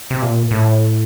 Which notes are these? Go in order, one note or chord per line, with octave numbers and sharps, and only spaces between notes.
C3
A#2
A2